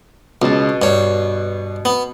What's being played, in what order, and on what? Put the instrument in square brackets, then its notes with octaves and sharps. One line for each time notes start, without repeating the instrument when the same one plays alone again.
[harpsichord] C#2 [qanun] B2 A5
[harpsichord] G2 C#5
B3